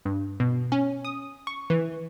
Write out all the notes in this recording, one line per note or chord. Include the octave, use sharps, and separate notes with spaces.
G2
B2
C#4
D#6
C#6
E3